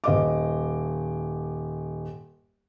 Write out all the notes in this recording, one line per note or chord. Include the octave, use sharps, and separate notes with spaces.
D#1 D#5 D6